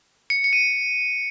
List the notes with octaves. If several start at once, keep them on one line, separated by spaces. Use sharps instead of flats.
C#7
C#7
D#7